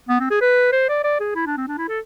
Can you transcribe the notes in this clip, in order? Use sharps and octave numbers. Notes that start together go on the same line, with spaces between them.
B3
C4
G#4
B4
C5
D5
D5
G#4
E4
D4
C4
D4
E4
A4